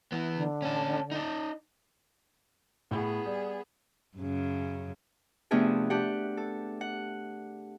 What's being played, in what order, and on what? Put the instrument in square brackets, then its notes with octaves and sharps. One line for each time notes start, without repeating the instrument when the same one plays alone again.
[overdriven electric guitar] E3 B3
[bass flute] D3
[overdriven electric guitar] C#4 A4
D#4 D5
[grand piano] A2 [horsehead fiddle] B3 G#4
[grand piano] G3
[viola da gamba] F#2 C#3
[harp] C3 F3 A3 B3 D4 G#4
D4 G4 F#5
A4
F#5